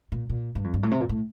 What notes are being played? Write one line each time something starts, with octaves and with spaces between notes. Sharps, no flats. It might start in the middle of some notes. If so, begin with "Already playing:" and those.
A#2
A#2
G2
F2
G2
A2
C3
A#2
A2